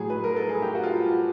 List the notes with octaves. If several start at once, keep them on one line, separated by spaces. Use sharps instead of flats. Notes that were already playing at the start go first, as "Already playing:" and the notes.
Already playing: A2 F#3 G#4
B4
A#4
A4
G#4
G4
F#4
F4